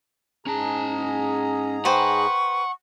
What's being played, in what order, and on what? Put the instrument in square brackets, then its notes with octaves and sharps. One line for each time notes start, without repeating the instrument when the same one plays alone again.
[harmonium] G#2 G#4 A#5 [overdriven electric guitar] C#4 A5
[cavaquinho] B4 C5 G5 [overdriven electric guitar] F#5 [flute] C#6